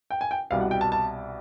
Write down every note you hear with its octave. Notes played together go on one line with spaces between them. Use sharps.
G5
G#5
G5
C2 B2 G3 F5
F#5
G5
A5
A5